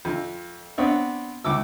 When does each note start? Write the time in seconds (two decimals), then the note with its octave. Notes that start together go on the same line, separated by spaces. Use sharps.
0.05 F2
0.78 B3 C4 D4 C#5
1.44 C#2 D6 E6